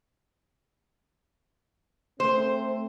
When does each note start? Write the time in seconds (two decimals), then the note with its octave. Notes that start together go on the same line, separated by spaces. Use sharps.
2.20 A3 C4 C5